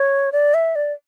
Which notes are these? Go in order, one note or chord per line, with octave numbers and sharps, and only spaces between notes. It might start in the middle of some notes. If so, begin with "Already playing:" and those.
Already playing: C#5
D5
E5
D5